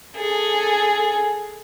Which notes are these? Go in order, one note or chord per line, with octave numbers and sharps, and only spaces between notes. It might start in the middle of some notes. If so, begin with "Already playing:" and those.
G#4 A4